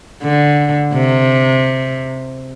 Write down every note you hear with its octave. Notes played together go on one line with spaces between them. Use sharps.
D3
C3